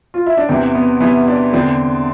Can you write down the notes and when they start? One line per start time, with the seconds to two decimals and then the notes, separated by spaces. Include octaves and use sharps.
0.14 F4
0.26 E4
0.37 D4
0.49 E2 C3 E3 C4
0.75 B3
1.00 E2 C3 E3 B3
1.28 D4
1.53 E2 D3 C4